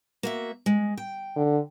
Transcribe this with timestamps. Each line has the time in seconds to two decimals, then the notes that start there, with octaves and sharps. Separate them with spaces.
0.23 A#3 F#4 E5
0.66 G#3
0.97 G5
1.36 D3